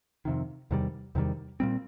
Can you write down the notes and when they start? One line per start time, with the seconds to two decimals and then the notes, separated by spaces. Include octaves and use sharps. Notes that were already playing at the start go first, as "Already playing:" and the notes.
0.25 F2 C3 D#3
0.71 E2 C3 D#3 G3
1.15 E2 C3 D#3 G3
1.60 A#2 G3 C4